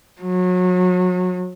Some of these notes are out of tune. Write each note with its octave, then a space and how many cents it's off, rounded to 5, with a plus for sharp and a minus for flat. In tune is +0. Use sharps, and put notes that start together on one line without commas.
F#3 -30